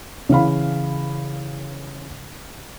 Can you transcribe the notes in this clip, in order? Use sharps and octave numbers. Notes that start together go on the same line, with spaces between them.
C#3 E3 F5 B5